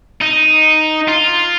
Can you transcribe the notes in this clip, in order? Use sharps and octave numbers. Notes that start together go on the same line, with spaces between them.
D#4
F4